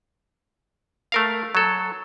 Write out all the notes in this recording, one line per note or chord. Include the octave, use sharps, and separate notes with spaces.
A3 A#4 F5
F#3 A4